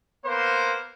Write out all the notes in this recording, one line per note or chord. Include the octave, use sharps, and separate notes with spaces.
A#3 B3 C5